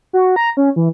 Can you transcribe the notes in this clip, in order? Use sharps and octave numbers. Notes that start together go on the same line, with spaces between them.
F#4
A#5
C#4
E3